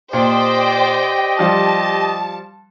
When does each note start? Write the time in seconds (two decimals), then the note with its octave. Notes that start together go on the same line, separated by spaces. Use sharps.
0.13 A#2 G4 C5 D5 D#5 G5
1.39 F3 G3 A5